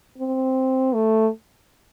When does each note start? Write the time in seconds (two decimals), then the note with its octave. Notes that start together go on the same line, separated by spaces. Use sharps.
0.18 C4
0.94 A3